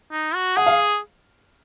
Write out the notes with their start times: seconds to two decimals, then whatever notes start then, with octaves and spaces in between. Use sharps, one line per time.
0.12 D#4
0.35 F#4
0.57 G#4 F#5
0.66 F5